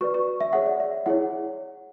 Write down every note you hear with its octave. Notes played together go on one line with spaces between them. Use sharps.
F#4 B4 D5 C#6
C#6
E5
G#4 C#5 F#5
D5
E5
E4 G#4 C#5 F#5